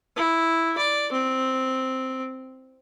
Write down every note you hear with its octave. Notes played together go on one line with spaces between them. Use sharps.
E4
D5
C4